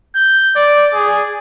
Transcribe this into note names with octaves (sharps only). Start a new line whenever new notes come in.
G6
D5
G#4